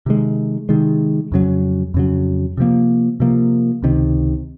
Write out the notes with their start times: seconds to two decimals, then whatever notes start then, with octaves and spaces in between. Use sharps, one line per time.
0.06 C3 D#3 G#3
0.69 C3 D#3 G#3
1.32 F2 C#3 F#3
1.94 F2 C#3 F#3
2.57 C3 F3 A#3
3.20 C3 F3 A#3
3.83 C#2 C3 D#3